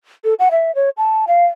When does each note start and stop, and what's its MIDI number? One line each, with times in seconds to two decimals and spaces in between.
0.24 0.34 69
0.39 0.49 78
0.51 0.74 76
0.75 0.90 73
0.97 1.25 81
1.28 1.45 77